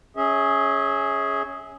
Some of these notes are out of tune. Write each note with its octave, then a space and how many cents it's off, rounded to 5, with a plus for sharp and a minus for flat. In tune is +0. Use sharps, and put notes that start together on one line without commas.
C#4 +0 G#4 +0 E5 -30